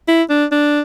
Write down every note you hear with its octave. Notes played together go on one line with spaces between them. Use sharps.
E4
D4
D4